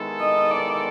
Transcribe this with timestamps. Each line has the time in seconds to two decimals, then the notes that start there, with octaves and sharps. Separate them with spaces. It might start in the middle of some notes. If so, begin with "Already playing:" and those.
Already playing: D#3 G#3 B3 E4 A4
0.20 D#5
0.51 D5